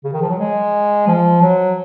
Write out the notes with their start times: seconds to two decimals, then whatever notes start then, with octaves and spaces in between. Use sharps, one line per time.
0.04 C#3
0.13 D#3
0.22 F3
0.30 F#3
0.39 G#3
1.08 F3
1.42 F#3